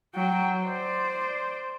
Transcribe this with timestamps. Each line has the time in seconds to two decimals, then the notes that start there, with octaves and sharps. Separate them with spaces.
0.15 F#3 G5
0.63 C5 D5